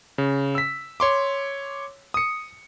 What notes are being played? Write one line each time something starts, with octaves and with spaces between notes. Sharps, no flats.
C#3
E6 B6
C#5 C6 D6
D#6 C#7